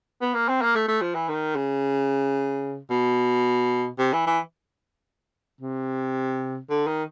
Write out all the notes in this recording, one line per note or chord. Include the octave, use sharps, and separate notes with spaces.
B3
A#3
C4
A#3
A3
A3
F3
E3
D#3
C#3
B2
C3
E3
E3
C3
D3
D#3